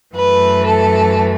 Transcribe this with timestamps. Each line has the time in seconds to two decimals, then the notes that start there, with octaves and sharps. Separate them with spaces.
0.14 F#2 E3 A3 B4
0.65 A4